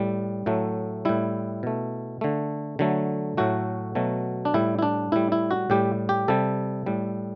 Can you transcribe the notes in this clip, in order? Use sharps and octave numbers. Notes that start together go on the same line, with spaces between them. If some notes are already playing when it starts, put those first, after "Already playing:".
Already playing: A2 G3
A2 F#3 A3
A2 G3 E4
B2 A3
D3 A3
D3 F#3 A3
A2 F#3 A3 F#4
B2 F#3 A3
D4
A2 G3 E4
E4
D4
A2 G3 E4
E4
F#4
A2 G3 G4
G4
C3 G3 A4
A2 G3